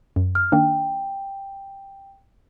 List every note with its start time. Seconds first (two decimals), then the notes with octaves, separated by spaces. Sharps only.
0.16 F#2
0.35 F6
0.52 D#3 A#3 D4 G5